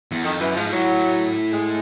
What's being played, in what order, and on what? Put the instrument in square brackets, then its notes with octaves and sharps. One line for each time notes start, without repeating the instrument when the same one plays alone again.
[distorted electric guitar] E2
[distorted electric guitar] F2 [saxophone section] D#3
[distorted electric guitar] F#2 [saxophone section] E3
[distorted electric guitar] G#2 [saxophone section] F3
[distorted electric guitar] A2 [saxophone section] F#3
[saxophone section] G#3